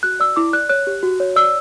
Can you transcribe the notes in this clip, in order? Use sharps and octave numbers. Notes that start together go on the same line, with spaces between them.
F#4 F#6
D5 E6
E4 D6
D5 F#6
C#5 F#6
G4
F#4
C#5
D5 E6